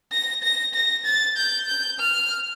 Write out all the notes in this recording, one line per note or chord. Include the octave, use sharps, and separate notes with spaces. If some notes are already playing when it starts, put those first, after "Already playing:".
A#6
A#6
A#6
A6
G6
G6
F6